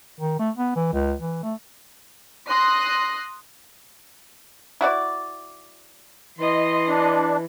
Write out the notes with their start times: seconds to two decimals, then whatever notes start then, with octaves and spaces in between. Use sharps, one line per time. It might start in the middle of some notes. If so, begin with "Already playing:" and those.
0.20 D#3
0.39 A3
0.57 B3
0.76 E3
0.93 C#2
1.21 E3
1.43 A3
2.48 C6 D#6 F#6 A#6 C7
4.81 E4 F#4 D5
6.39 E3 D#5 C6
6.89 D4